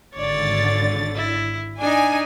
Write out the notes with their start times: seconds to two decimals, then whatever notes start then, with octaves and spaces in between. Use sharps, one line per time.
0.15 G#1 D3 C#5 D5 A6
1.16 E4
1.79 D4 D#4 G#5